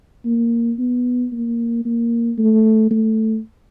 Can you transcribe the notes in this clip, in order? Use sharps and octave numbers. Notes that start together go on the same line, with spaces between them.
A#3
B3
A#3
A#3
A3
A3